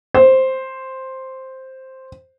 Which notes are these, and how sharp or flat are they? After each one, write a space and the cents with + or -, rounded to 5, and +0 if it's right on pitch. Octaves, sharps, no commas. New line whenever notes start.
C5 +5